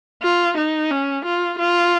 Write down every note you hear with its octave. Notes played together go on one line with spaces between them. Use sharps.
F4
D#4
C#4
F4
F4